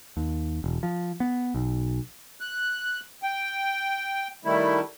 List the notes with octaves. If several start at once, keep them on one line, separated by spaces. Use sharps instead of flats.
D#2
E1
F3
B3
B1
F#6
G5
D#3 G3 A3 E4